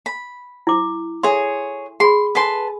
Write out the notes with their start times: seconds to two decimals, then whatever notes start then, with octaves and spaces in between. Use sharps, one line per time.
0.06 B5
0.67 E4 D6
1.23 G#4 A4 C#5 E5 C6
2.00 G#4 B5 C6
2.35 A4 B4 G#5 A5 C6